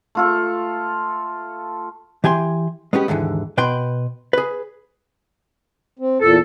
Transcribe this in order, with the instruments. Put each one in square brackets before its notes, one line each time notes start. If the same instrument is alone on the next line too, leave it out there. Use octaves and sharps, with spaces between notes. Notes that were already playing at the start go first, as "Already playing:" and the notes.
[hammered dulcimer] A3 F4 A4
[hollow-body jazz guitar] E3 G4 G#5 C6
G#3 B3 C#4 G4
D#2 G#2 D3 E3
B2 B4 G5 C6
G#4 B4
[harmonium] C4
[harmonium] E2 A#2 [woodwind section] A4